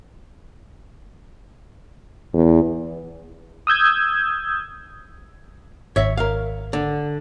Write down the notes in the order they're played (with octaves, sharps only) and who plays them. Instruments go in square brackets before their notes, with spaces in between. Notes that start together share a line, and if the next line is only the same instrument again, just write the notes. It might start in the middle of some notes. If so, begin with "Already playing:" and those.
[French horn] E2
[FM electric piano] D#6 E6 G6 G#6
[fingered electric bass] G#1 [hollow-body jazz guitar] C#5 E5
[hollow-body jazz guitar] A#4 F5
D3